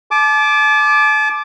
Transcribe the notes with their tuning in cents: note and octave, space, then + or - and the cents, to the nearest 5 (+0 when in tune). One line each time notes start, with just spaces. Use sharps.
A5 -40 D6 +5